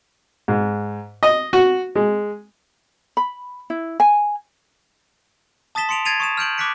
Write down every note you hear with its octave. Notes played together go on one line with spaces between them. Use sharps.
G#2
D#5
F#4
G#3
B5
E4
G#5
A5 D#6 A6 B6 E7 G7
C6 D#6 C#7 D7 F7
G#6 A6 C7 D7 D#7 F7
C#6 D#6 E7
F6 G6 D7 F#7
D6 F6 F#6 B6 C#7 D7